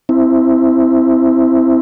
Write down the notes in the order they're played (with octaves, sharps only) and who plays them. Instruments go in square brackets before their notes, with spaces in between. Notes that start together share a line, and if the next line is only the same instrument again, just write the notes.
[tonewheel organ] C4 E4